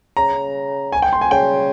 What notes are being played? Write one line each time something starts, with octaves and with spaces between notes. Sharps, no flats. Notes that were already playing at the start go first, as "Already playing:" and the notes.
C#3 A#5
G#5
G5
C6
G#5
C#3 G5